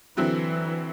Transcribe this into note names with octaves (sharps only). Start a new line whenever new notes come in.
D3 E3 F#3 C4 E4